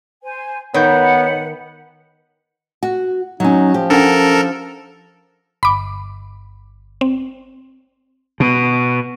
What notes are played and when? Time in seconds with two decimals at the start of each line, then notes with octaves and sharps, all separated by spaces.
0.23 C5 G#5
0.74 D#3 B3 B4 C#5 F#5 G6
2.83 F#4
3.40 F#3 C#4 D#4
3.74 F3 G4
3.90 C#4 D4 A4 A#4 F#5
5.63 G1 B5 D6
7.01 C4
8.40 B2